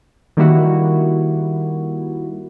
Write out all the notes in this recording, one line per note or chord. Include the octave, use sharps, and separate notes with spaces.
D#3 G3 A#3 E4 F#4